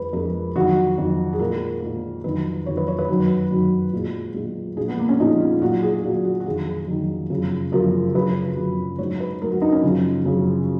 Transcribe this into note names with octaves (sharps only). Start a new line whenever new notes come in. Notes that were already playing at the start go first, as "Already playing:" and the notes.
Already playing: F2 F3 G#3 B4
F2 F3 G#3 A#4
F2 D#3 F#3 F#4
F2 D#3 F#3
G#4
A#2 G#3 A#4
A#2 G#3
F2 D#3 F#3 B4
F2 D#3 F#3 C#5
B4
C#5
B4
F#2 D#3 F#3
F#2 D#3 F#3
A#2 G#3
A#2 G#3
A#2 F3 G#3 G#4
B3
A#3
C#4
A#2 F3 G#3 D#4
F4
A#2 F#3 F#4
G#4
A#2 F#3 F#4
F#4
F#4
F2 D#3 F#3 G#4
G#4
F2 D#3 F#3
F#2 C#3 F3
F#2 C#3 F3 A#4
F#2 C#3 F3 B4
F#2 C#3 F3
G#2 F#3 C#5
B4
G#2 F#3 A#4
F#4
D#4
C#4
F#2 C#3 F3
F#2 C#3 F3